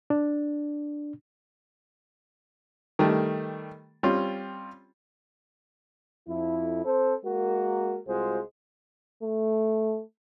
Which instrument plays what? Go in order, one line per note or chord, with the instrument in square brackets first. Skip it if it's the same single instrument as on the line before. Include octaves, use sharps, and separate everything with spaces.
[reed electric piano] D4
[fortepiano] D#3 G3 A3
G3 C4 C#4 F4
[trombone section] F2 E4
C4 A4 C5
G#3 A#3 F#4 A#4
C2 G#3 F4 F#4 C5
[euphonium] A3